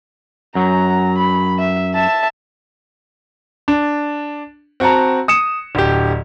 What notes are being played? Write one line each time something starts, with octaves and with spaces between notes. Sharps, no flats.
F#2 F#3 A#5
B5
E5
E5 A5
D4
C4 F#4 F#5 A5 A#5
D#6 C#7 E7
D1 G4